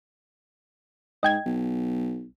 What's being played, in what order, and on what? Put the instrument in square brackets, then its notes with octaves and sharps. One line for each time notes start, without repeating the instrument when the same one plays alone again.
[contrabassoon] G#2 [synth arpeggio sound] D#5 G5 G#6
[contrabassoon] B1